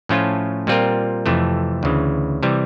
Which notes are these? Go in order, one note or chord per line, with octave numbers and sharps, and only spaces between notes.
A2 F3 A3 C#4 F4
A#2 G3 C4 F4 A#4
F2 C3 E3 A3
D2 C#3 E3
C3 E3 G3